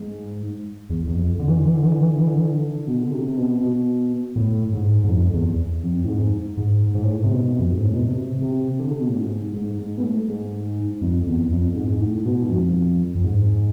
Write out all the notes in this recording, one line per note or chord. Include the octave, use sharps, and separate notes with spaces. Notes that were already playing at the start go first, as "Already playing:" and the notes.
Already playing: G#2
E2
E2
F2
D3
E3
D3
E3
D3
E3
D3
E3
D3
E3
D3
E3
D3
B2
D3
C3
C3
B2
B2
A2
G#2
G#2
F2
E2
F2
A2
G#2
G#2
G#2
A2
G#2
C3
B2
F2
G#2
A2
B2
C3
C3
D3
C3
B2
A2
G#2
G#2
G#2
B2
A2
G#2
F2
E2
F2
G#2
G#2
A2
B2
G#2
F2
F2
G#2